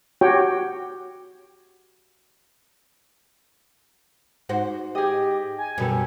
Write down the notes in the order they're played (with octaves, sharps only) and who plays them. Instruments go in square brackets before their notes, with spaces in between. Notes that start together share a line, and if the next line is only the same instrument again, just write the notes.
[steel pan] F#4 G4 C#5 G5
[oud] G#2 F#4 C5
[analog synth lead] G4 [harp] G#4 D#5
[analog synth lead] G#5
[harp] F#2 B2 A4 [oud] G3